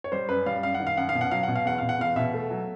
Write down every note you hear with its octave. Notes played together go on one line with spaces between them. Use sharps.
C#5
G3 C5
F#2 B4
G3 F5
F#2 F5
F#5
D#3
F5
F#2 F#5
F5
B2
F#5
F#3 F5
B2 F#5
F5
E2 F#5
B2 F5
F#5
E2 F5
B2 E5
A3
F#3